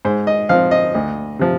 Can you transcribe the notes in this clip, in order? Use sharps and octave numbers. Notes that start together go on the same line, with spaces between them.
G#2 C5
D#5
F3 C4 F5
D#5
D2
C3 F3